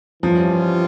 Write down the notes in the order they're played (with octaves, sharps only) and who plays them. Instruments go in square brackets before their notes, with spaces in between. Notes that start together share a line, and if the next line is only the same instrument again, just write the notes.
[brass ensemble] G2 E3 G3 C#4 F4 [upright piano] F3